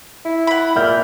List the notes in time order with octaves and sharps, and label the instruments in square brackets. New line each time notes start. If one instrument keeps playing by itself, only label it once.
[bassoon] E4
[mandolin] F#5 B5
[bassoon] A#2 [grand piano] E5 F6 G6